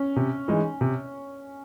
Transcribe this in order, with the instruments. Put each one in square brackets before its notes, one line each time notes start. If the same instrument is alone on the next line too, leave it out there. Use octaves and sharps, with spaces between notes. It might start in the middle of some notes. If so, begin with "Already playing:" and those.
Already playing: [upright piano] C#4
[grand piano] C3
E3 G#3 D#4
C3